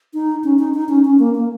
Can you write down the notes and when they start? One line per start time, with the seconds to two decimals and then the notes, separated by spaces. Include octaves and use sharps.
0.14 D#4
0.44 C#4
0.59 D#4
0.74 D#4
0.89 C#4
1.05 C#4
1.19 A#3
1.35 A#3